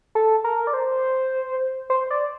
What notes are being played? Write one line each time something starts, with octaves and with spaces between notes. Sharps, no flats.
A4
A#4
D5
C5
C5
D5